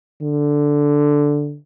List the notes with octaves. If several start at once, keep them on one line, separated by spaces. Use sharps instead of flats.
D3